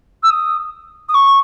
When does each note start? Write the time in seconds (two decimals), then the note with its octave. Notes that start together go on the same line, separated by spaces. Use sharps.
0.23 E6
0.30 D#6
1.09 D#6
1.14 C#6